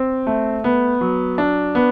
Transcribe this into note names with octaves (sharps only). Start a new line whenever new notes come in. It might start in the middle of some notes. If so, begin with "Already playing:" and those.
Already playing: C4
A3
B3
F#3
D4
B3